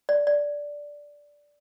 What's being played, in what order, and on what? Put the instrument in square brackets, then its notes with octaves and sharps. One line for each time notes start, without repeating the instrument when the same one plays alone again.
[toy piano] D5
D5